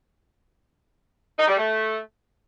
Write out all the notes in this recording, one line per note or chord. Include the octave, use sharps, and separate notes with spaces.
D#4
G3
A3